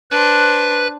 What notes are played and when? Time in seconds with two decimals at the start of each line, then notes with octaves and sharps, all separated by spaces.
0.11 D4 B4 C5 F#6